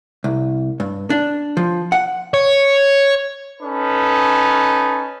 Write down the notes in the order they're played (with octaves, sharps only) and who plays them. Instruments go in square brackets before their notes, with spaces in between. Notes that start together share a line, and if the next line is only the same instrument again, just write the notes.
[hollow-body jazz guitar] C2
G2
D4
F3
F#5
[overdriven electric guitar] C#5
[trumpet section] C#4 D#4 A4 B4